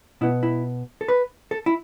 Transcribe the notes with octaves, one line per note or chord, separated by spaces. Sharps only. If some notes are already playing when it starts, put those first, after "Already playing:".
B2 B3 E4
E4
A4
B4
A4
E4